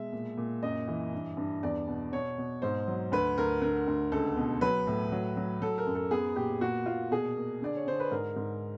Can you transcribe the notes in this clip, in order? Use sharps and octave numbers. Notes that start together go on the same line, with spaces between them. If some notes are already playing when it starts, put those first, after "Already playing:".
Already playing: B2 G#3 E5
A#2
A#2
F#2 D#5
E3
G2
G2
E2 D5
B2
B2 C#5
B2
G#2 C5
F#3
D2 B4
D2 A#4
D3 A#4
D2
C#2 A4
B2
F#3 B4
A2
F#3
F#3
F#3 A4
A#4
F#2
A4
B3 G#4
A#2 G4
A#2 F#4
A#2 F4
B2 G#4
A#3
D3 D5
C#5
D3 C5
B4
G#2 A#4
G#2